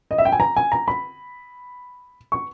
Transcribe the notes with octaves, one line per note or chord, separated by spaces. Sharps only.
D#5
E5
G5
G#5
A#5
G#5
A#5
B5
C#6